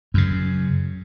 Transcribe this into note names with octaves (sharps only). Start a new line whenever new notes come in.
F#2 C#3